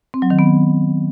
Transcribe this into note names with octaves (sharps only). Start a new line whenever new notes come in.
C4
F#3
D#3
B3